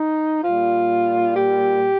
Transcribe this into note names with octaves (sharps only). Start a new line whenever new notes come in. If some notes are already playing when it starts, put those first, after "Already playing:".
Already playing: D#4
A#2 G3 F4
G4